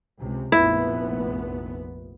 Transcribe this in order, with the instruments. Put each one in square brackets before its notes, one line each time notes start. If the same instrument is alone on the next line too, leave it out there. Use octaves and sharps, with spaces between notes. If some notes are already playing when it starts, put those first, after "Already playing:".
[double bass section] C#2 C3
[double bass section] F1 A#1 B3 [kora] E4